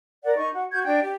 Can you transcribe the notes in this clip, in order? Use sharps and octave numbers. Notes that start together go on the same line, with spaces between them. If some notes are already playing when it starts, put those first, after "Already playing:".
A#4 D5 F#5
D#4 C#6
F#4 F#5
F#4 G6 G#6
D4 G5
G4